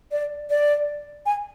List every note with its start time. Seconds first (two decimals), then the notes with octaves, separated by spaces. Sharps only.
0.12 D5
0.50 D5
1.26 G#5